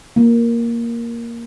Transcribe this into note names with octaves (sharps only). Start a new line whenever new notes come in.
A#3